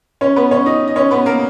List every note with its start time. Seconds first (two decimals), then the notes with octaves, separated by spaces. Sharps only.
0.21 C#4 C#5
0.36 B3 B4
0.51 C#4 C#5
0.66 D#4 D#5
0.88 D#5
0.96 C#4 C#5
1.11 B3 B4
1.26 A#3 A#4